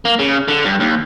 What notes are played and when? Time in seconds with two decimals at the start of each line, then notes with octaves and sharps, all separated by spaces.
0.05 A#3
0.19 C#3
0.48 D3
0.64 G2
0.80 D#2